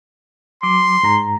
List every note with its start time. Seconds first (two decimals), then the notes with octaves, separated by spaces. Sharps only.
0.63 F#3 C6 D6
1.03 G#2 A#5